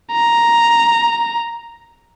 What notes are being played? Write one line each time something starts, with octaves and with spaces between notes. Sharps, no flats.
A#5